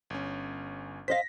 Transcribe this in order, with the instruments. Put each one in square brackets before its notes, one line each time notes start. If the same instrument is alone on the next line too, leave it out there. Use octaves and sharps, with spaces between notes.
[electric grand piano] G1 C#4
[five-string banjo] C5 D#5 F5 [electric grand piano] A#6 B6